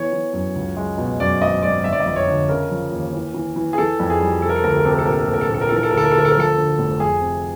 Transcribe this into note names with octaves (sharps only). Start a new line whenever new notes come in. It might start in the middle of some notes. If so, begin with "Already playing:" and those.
Already playing: E3 B3 C#5
E3
F#2
C#2
G#3
B2
F#2 D5
G#1 D#5
G#1 D5
G1 E5
D5
D#5
F2
C#5
D3
C#3 A#4
F3
D#2
E3
E3
E3
G#4
E3 A4
F2
G#4
G3
C3 A4
A#4
A4
D2 A#4
A4
A#4
C3 A4
A#4
A4
A#1 A#4
A4
A#4
A#1 A4
A#4
A4
A#1 A#4
A4
A#4
A4
E3 A#4
A4
D2 A#4
A4
A#4
A4
D2 A#4
A4
A#4
F3 A4
D3
F1
F2 G#4
C3